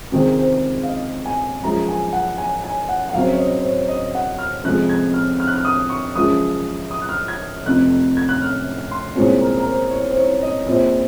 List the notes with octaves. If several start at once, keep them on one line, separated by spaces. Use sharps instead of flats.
C#2 C3 D#3 G#3 C5
C5
F5
D#5
G#5
F#2 F3 G#3 A#5
G#5
F#5
G#5
G#5
F#5
F#5
F#2 C#3 F#3 C4 F5
C#5
D#5
C5
C#5
D#5
F#5
F6
F2 C3 F3 G#3 F#6
G#6
F6
F6
F#6
F6
D#6
C#6
F#2 C#3 F3 G#3 D#6
D#6
F#6
F6
G#6
F1 F2 C3 F#6
G#6
F#6
F6
C6
C2 A#2 G#3 C4 C#5
A#4
A#4
C5
C#5
C5
C#5
D#5
A#1 A#2 F3 C4